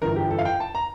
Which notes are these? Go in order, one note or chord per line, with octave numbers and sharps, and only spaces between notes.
G1 G2 E3 A#4
G4
A4
F5
G5
A5
A#5